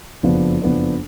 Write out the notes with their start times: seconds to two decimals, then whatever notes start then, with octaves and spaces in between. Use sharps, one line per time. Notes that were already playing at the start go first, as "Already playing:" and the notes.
0.23 F#1 F2 F3 B3 D4
0.61 F#1 F2 F3 B3 D4